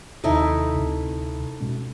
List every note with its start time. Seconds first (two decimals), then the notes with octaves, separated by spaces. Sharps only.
0.24 D#2 C3 A3 D#4 E4
0.75 D2 C3
1.61 B2 G#3 C#4